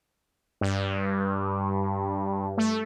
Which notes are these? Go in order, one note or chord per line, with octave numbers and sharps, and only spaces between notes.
G2
A3